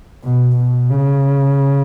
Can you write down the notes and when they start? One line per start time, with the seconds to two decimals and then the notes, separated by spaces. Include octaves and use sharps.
0.24 B2
0.57 B2
0.90 C#3